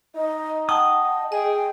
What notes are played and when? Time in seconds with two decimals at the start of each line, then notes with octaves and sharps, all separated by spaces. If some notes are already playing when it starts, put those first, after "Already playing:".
0.15 D#4 D#5
0.69 D#5 F#5 G5 A5 D#6
1.32 G#4 D#5 G5